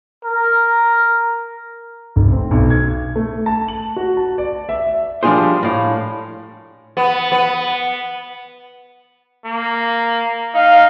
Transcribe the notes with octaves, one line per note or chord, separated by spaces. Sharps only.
A#4
F1
C4
B1
G#6
A3
A5
F#7
F#4
A5
D5
E5
F3 G3 D4 F4 G#4 C5
A2 F5
B3
B3
A#3
D#4 F5